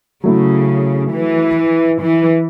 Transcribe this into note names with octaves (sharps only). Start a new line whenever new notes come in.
C#3 F#3 A3 E4
E3
E3